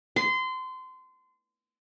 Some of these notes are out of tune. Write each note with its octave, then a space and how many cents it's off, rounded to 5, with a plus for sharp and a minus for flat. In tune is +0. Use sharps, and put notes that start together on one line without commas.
C6 -25